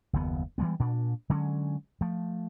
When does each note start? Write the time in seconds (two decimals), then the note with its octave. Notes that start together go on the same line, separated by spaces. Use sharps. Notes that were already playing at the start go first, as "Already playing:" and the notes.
0.13 F#1 D#2 B3
0.58 E3 G3 G#3 B3
0.80 A#2 D4
1.30 D3 F#3 G#3 C#4
2.01 F3 A3